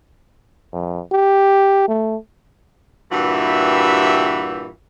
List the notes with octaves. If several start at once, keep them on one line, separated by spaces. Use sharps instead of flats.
F2
G4
A3
G2 A#2 E3 F#4 G4 E5